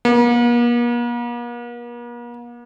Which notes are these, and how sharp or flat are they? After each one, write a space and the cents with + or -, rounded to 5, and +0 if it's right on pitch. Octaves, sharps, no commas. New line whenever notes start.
A#3 +45